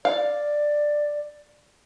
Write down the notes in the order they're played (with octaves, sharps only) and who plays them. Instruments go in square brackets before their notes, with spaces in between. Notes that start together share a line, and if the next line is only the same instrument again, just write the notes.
[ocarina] D5 [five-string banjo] F5